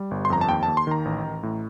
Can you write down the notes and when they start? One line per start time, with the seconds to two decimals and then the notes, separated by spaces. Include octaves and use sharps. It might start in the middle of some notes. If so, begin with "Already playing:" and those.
Already playing: G3
0.11 G1
0.25 C6
0.30 F2 A#5
0.41 A5
0.49 D#2 G5
0.63 A5
0.68 D#2
0.77 C6
0.87 D#3 A#5
1.05 A1
1.24 A1
1.43 A2